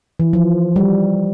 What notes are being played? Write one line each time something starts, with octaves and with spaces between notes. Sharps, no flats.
E3
F3
G3